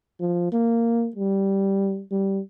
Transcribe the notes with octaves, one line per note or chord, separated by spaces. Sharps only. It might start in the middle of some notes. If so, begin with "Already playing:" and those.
F3
A#3
G3
G3